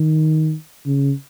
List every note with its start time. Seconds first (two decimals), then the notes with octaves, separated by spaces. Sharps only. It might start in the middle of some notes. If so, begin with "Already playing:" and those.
Already playing: D#3
0.86 C#3